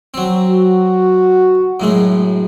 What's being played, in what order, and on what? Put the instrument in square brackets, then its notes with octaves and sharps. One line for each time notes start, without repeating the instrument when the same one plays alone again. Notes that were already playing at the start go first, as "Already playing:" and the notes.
[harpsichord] F#3 C4
[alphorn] F#4
[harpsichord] F#2 A2 G#3